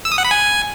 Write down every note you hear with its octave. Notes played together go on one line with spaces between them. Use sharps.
E6
D#6
F#5
B5
G#5